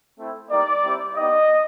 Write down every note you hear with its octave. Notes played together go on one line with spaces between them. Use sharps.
A3 C4 E4
G3 A#3 D#4 D5
G3 C4 E4 G4
B3 D#4 G4 D#5